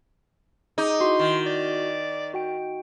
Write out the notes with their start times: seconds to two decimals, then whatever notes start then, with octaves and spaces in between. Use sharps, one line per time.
0.78 D#4 G#4 D6 D#6
1.00 E4 F#4 C6
1.19 D#3
1.46 D5
2.34 F#4 G5 D7